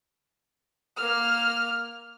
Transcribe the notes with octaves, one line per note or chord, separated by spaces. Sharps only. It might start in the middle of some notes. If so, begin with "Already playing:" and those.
A#3 F6